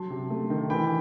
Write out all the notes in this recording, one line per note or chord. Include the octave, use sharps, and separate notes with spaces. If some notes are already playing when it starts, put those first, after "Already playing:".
Already playing: F#3 A5 C6
C3
A3
D#3
E3 G5 B5